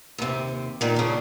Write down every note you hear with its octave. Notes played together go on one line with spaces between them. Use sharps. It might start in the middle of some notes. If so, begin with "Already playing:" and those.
D#2 C3
A#2 D#3
C#3 D4